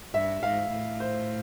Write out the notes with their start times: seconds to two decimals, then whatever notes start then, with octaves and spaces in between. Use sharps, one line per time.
0.14 G2 E5
0.43 G#2 F5
0.71 A2
1.00 C5